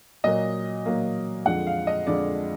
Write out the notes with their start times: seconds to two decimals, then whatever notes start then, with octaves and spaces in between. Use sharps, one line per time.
0.24 A#2 F#3 A#3 D#5
0.86 A#2 F#3 A#3
1.45 F2 D3 F3 G#3 F#5
1.67 F5
1.87 D#5
2.07 F2 D3 F3 G#3 D5